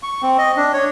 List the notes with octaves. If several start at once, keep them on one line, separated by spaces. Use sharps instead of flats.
C#6
C4
D#5
D4
C#5